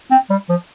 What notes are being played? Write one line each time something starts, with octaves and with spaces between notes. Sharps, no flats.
C4
G3
F3